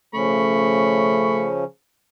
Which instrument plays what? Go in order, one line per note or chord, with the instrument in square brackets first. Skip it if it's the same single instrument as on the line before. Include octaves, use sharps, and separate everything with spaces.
[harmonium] C#3 F3 C#4 [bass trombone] A3 [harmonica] B5 C#6